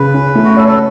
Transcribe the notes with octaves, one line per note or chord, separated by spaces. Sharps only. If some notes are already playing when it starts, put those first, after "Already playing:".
Already playing: C#3 B4
C#4
A3
F#4
A4 C#5
A4